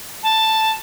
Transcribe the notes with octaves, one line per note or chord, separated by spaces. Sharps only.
A5